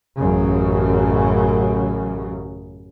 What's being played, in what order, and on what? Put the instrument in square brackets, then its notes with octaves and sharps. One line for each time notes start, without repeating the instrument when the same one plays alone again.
[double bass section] A1 F#2 C#3